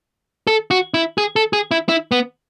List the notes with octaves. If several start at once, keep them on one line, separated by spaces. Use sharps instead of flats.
A4
F#4
E4
G#4
A4
G#4
E4
E4
B3